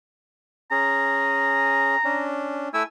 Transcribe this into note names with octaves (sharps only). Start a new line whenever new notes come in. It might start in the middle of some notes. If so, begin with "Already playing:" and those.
C#4 G#4 A#5
C#4 D4
A3 E4 G#5 E6